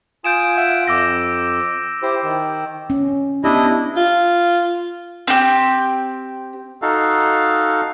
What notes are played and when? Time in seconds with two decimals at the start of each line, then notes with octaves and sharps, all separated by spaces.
0.24 F4 G#5 D#6 G6 D7 E7
0.57 F4 E5 F#5
0.88 F2 D6 E6 A#6
2.02 E4 G4 C5
2.23 D#3
2.90 C#4
3.44 B3 D4 E4 G4 D#5
3.97 F4
5.27 C4 G4
6.82 D#4 F#4 A4 F5